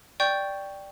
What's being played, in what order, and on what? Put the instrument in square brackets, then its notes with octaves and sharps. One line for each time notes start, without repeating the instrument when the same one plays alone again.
[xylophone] D5 G5 C#6 G6